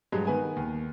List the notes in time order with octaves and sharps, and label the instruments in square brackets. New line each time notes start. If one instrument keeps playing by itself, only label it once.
[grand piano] G2 F#3 G#3
D#3 B3 B4 G#5
D#2